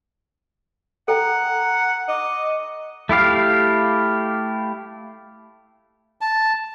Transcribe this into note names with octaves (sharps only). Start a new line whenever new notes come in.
A4 F#5 G5 A#5
D#5 D6
A3 E4 G4 F5
A5